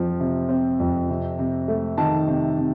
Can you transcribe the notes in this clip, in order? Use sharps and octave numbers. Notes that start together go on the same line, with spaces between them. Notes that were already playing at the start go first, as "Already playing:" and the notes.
Already playing: F2 F3 C4
C3
C4
F2
C3
C3
A3
D#3 A5
C3
C3